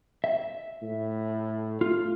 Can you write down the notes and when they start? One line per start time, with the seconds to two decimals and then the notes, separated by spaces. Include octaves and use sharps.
0.24 E5
0.82 A2
1.81 A3 F4